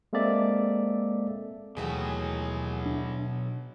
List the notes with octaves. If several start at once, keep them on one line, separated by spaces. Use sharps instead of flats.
G#3 A#3 C4 A4 D5 E5
D#2 B2 E3 F#3 A3 G#4
D4